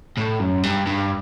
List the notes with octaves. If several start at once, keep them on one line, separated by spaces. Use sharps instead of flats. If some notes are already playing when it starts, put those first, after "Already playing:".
A2
F#2
G2
G2